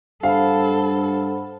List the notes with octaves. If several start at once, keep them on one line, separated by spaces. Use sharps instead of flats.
G2 A4 C5 F5 F#5 B5